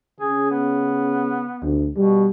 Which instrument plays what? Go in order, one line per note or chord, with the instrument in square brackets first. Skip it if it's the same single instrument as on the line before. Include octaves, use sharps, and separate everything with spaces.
[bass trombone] C#3 [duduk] G#4
[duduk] B3
[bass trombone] D2
[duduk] B2 [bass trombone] G3